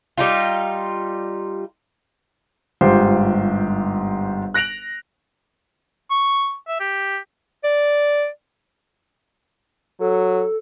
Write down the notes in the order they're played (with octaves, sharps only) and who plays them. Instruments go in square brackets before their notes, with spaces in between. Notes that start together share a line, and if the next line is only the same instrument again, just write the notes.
[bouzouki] G3 D#4 F4
[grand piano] G1 G#2 F4 G4 C5
F#6 A#6 D7 F7 F#7
[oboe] C#6
E5
G4
[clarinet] D5
[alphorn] F#3 [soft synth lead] A4